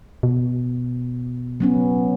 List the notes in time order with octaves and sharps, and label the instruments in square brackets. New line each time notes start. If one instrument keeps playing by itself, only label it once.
[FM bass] B2
[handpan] F#3 B3 C#4